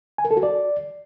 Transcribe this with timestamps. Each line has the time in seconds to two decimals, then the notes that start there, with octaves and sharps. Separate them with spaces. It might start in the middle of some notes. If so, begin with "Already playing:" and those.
0.18 G#5
0.25 A#4
0.31 A4
0.37 F#4
0.43 D5